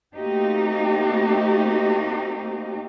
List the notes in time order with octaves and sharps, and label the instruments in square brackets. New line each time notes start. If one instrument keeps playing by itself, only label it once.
[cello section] A3 A#3 C4 D#4 F#4 G4